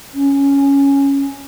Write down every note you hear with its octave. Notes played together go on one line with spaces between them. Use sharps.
C#4